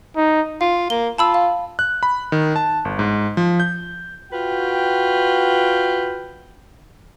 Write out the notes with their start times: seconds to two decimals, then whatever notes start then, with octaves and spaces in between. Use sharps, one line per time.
0.16 D#4
0.61 F4 F5
0.90 A#3 G7
1.18 F4 A5 B5 E6
1.34 F5
1.79 F#6
2.03 B5
2.32 D#3
2.56 A5
2.85 G1
2.99 G#2
3.37 F3
3.60 G6
4.32 F4 F#4 B4 G5